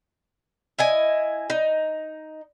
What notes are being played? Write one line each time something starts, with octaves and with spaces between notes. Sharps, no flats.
E4 D#5 G#5
D#4